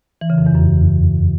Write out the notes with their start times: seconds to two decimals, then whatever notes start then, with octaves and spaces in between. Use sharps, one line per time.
0.21 E3
0.30 C#3
0.38 F2
0.47 E2
0.55 F#2